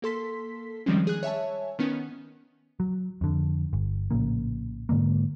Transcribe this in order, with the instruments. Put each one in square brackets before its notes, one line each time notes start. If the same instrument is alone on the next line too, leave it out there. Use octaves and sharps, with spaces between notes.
[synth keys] A#3 A4 C6 B6
D#3 F3 G3 G#3 C4 C#4
G#4 F#6
C#5 E5 G#5 A5
D#3 B3 C#4
[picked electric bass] F#3
F2 D3
G1
A#1 A2 C#3 A#3
G#2 D3 G#3 A#3